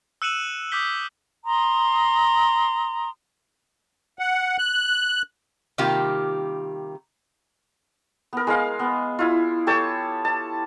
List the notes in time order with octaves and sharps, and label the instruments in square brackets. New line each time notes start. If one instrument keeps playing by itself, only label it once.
[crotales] E6 F#6 C#7 D#7 E7 F#7
D6 D#6 G6 B6 G7
[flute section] A#5 C6 D#6
[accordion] F#5
F#6
[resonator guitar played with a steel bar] C3 D#3 G3 A#3 F4 G4
[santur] B3 A#4
G#3 A#4 F5
B3
E4 F4
G4 A4 C#5 A5
A5